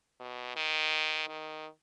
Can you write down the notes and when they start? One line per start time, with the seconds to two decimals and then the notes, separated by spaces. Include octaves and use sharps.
0.20 B2
0.56 D#3
1.29 D#3